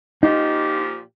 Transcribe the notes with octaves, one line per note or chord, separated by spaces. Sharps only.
A#2 F3 D#4 G4